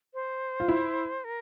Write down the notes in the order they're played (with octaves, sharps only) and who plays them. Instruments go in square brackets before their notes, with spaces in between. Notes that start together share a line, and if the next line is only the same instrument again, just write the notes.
[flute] C5
[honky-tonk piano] F4
E4
[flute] A#4